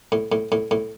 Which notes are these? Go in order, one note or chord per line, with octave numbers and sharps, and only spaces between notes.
A2
A2
A2
A2